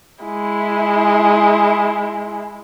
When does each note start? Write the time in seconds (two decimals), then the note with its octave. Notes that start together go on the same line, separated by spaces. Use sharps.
0.25 G#3 E4